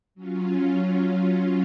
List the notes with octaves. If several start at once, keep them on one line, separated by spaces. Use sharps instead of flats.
F#3 C#4 F4